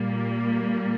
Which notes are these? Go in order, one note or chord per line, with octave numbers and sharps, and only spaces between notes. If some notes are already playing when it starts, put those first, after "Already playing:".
Already playing: A#2 G3 A#3